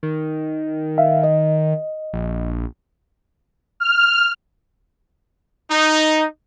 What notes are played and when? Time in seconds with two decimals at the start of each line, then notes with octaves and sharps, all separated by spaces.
0.03 D#3
0.98 E5 F5
1.24 D#5
2.13 A#1
3.80 F6
5.71 D#4